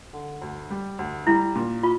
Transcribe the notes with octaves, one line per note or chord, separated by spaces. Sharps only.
D3
D2
G3
D2
G3 E4
A#2
F4